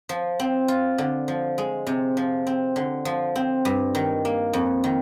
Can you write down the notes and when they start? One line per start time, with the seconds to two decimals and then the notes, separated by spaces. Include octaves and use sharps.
0.09 F3
0.40 C4
0.68 F4
0.98 D3
1.28 F3
1.58 G#3
1.87 C3
2.17 F3
2.47 C4
2.76 D3
3.05 F3
3.36 C4
3.65 G2
3.95 D#3
4.25 A#3
4.53 F2
4.84 D#3